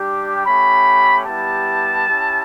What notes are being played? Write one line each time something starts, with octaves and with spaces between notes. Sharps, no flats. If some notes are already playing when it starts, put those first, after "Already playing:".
Already playing: G3 D4 G4
A3 C#4 G4 B5
G3 B3 E4 G4 A5
C#4 E4 G4